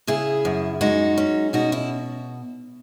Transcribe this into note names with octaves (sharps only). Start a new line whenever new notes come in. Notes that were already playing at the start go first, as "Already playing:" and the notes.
C#3 E4 G#4
F#2
G#3 D#4 F#4
C#4
B2 D#4 F#4
E4